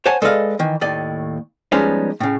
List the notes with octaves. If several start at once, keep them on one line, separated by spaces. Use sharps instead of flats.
C5 C#5 F#5 G#5 A5
G#3 A4 B4 D5 D#5 F5
D#3 E3
D#2 A2 D5 D#5
F3 G3 G#3 B3 C#4 D#4
A2 C#3